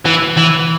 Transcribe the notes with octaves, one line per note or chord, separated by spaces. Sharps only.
E3
E3